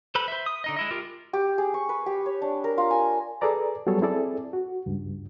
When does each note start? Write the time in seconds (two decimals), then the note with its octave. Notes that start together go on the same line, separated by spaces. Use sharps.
0.15 A4 B4 C5 B5
0.28 C5 E5
0.46 D#6
0.64 D3 D#4 D#5
0.76 G#3 E4 D#5
0.91 F4 G4 A#4
1.33 G4
1.58 G#4
1.74 C#6
1.89 B4
2.06 G4
2.26 C#5
2.42 D4
2.64 A#4
2.78 F4
2.91 G#5
3.41 G#4 A4 B4 D5 A#5
3.87 F#3 G3 B3 G#4 A4 C#5
4.02 C4 E4 G#4 A4 D5
4.53 F#4
4.86 C#2 G2